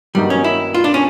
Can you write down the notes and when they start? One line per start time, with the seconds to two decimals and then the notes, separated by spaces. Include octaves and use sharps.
0.15 G2 D#3 F#3 G3 A#3 D#4
0.30 C#4
0.44 E4
0.74 F4
0.84 D4
0.94 C#4